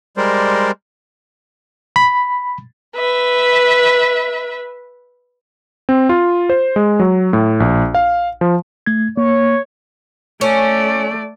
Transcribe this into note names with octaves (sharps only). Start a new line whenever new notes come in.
G3 G#3 A#4 C5 D5
B5
B4 E5
C4
F4
C5
G#3
F#3
A2
A#1
F5
F3
A3 G#6
A#3 C#5
A3 C#4 D5